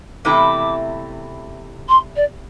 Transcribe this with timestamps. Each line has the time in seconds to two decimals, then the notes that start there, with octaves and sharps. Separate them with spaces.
0.25 E2 C3 E3 A3 E4 D6
1.88 C6
2.16 D5